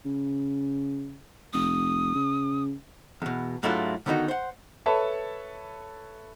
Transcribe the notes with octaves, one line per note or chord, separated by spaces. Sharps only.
C#3
F1 D#6
C#3
E2 B2
G#2 F#3 A3 D4 E4 F4
D3 D#3 B3 D#4 F#4
C5 F#5
A4 B4 C#5 E5 A5 B5